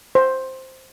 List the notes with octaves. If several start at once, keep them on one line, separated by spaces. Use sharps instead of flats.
C5